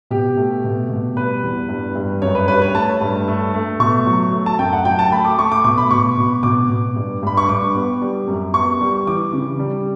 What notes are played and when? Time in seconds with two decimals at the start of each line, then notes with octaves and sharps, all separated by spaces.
0.10 B2 G4
0.37 A3
0.64 B2
0.90 B2
1.17 G3 B4
1.43 E2
1.69 G2
1.95 G2
2.22 F#2 C#5
2.35 B4
2.48 G3 B4
2.62 C#5
2.75 A3 A5
3.01 G2
3.28 A3
3.54 A3
3.80 B2 C#6
4.06 F#3
4.33 A3
4.46 A5
4.59 F#2 G5
4.73 F#5
4.85 F#3 G5
4.99 A5
5.12 A3 B5
5.25 D6
5.38 A3 C#6
5.52 D6
5.64 B2 D6
5.78 B5
5.91 B2 C#6
6.17 B2
6.43 B2 D6
6.70 B2
6.96 G2
7.23 G2 B5
7.37 C#6
7.49 G2 D6
7.75 B3
8.02 G3
8.28 F#2
8.54 B3 C#6
8.81 G3
9.07 E3 D6
9.33 C#3
9.59 G3